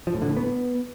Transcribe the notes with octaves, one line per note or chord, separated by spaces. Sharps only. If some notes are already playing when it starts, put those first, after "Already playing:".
F3
A2
D3
A2
B3